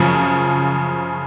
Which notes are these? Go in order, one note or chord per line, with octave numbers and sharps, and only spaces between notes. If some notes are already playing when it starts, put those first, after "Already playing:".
Already playing: F#2 C#3 F3